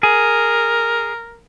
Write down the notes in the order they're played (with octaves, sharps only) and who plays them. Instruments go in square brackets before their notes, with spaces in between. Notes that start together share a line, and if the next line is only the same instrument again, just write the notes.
[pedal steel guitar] G#4 [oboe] A#4